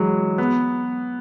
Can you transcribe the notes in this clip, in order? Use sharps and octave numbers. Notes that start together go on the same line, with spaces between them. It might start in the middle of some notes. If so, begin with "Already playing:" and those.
Already playing: E3 F#3 G#3
B3